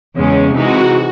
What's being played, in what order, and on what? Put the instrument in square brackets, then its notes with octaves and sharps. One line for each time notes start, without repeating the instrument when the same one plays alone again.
[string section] E2 C#3 G#3 C#4
[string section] C3 E3 G#3 D#4 [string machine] F#4